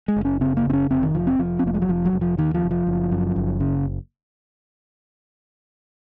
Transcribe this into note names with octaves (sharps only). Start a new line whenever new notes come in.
G#3
F#1
C#4
C#3 C4
A#3
F#1 C4
C#4
F1 C4
D#3
F1 F3
C4
F1 F3
C4
F1 A#3
G#3
F#3
F1 F3
F#3
F1
F3
D#2 D#3
F3
F1
F3
F#1
F#2
F#1
C#3